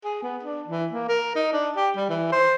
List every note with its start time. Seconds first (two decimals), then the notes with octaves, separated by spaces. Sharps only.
0.04 G#4
0.23 B3
0.43 D4
0.67 E3
0.92 A#3
1.09 A#4
1.35 D#4
1.53 D4
1.76 G4
1.96 G3
2.09 E3
2.32 C5